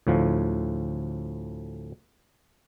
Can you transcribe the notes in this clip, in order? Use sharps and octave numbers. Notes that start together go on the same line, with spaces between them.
D2 A2 F3